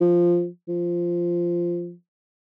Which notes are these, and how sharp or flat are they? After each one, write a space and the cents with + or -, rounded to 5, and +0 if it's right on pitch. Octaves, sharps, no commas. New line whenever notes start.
F3 -5
F3 -10